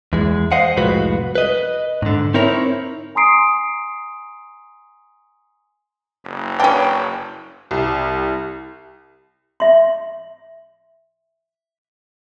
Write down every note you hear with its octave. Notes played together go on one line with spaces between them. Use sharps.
E2 G#3
C5 D#5 F5 F#5
C2 F2 A2 G#3 F#4 B4
B4 D#5
G#2 D3
C4 D#4 E4 A#4 C#5
G#5 A#5 C6 D#6 C7 D7
F#1
C#4 D4 B4 G5
C2
E5 C6